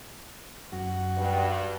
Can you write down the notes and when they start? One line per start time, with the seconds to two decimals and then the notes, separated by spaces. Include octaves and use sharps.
0.72 F#2 F#4
1.16 G2